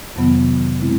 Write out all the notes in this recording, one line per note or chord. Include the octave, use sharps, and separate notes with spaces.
F2 C3 D#3 F#3 B3
B2 G#3 C4 E4